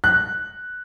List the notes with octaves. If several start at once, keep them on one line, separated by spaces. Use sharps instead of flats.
F#6